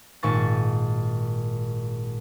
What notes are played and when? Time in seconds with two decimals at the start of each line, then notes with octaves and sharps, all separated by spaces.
0.23 G#1 A#2 C#6 A6